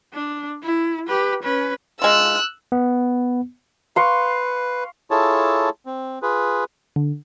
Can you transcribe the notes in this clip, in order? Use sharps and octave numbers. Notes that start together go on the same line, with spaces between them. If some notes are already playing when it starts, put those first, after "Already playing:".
D4
E4
G4 B4
C#4 B4
G#3 F4 E6 F#6
B3
B4 F5 C6 C#6
E4 F4 G#4 A4 C#5 A5
C4
F4 G#4 B4
D3